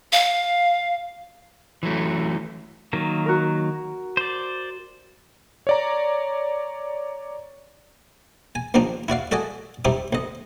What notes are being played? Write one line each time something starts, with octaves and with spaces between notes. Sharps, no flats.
F5
E3 F#3 A3
D#3 F#3 A#3
F#4 A#4
C5 D5
C#5 D5 A#5
G#5
D#2 F3 C4 D4 D#4
E4 F#4 D5 F5
F#4 A4 D5 D#5 G#5
G3 C4 D#4 E4 G4
D2 D#5